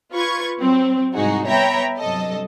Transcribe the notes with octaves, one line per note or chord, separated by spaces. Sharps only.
F4 B4 C#6 G#6
F#3 C4
C2 G#2 D#4 F#4 G#4
B3 C#5 E5 G5 A#5 B5
G2 C3 F#3 A4 D#5